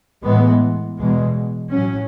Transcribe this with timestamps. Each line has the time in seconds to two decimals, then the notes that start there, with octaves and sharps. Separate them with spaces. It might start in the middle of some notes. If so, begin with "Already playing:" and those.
0.23 A2 E3 G#3 B3
0.97 E2 B2 G#3
1.71 A2 F#3 C#4